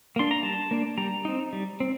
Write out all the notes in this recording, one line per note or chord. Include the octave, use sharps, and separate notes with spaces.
A#3 D4 C6
A#5
G3 A5
A#3 D4
G3 A#5
C4 D#4
G3
C4